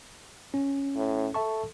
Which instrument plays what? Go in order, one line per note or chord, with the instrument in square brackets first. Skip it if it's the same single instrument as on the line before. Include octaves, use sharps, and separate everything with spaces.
[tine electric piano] C#4
[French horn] A2
[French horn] A4 [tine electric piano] E5 A5 C#6